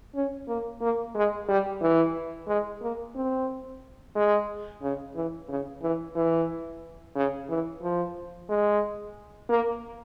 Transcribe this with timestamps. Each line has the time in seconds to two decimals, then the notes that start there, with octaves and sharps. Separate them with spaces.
0.15 C#4
0.48 A#3
0.81 A#3
1.15 G#3
1.48 G3
1.81 E3
2.48 G#3
2.82 A#3
3.15 C4
4.15 G#3
4.82 C#3
5.15 E3
5.49 C#3
5.82 E3
6.15 E3
7.15 C#3
7.49 E3
7.83 F3
8.49 G#3
9.49 A#3